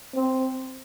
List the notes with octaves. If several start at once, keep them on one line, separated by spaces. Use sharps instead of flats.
C4